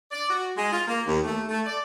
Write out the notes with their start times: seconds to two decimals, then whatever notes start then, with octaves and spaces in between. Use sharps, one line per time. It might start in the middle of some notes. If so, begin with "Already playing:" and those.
0.11 D5
0.30 F#4
0.57 G#3
0.72 F4
0.88 A#3
1.07 D#2
1.24 A3
1.49 A3
1.66 D5